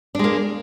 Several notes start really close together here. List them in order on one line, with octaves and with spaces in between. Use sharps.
D4 G#3 A#3